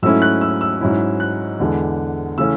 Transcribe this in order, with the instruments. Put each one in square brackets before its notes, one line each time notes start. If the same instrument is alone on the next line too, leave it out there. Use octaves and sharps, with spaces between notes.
[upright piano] G#2 F#3 A3 C#4 E4 E6
F#6
E6
E6
G#2 F#3 C#4 E4
F#6
E2 D3 G#3
C#3 E3 A3 C#4 E6